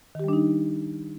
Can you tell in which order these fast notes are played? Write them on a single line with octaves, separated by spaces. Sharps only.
D#3 G4 G3 D4 D#4